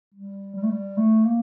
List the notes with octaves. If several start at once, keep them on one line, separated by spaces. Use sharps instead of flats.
G3
G3
A3
G3
A3
A#3